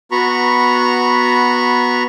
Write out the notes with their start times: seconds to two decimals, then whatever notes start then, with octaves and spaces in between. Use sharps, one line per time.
0.11 B3 F#4 A#5 B5 C#6